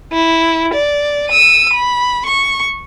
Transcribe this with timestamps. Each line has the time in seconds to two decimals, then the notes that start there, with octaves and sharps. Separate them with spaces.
0.12 E4
0.74 D5
1.29 E6 D#7
1.73 B5
2.26 C#6